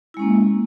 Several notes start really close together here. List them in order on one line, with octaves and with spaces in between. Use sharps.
E4 G#3 C#4 A#3